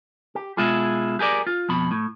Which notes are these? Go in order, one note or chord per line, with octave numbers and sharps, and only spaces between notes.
G4
B2 G#3 E4 F4 G#4
G4 G#4 A#4 D5
F4
F2 B2 B5
A2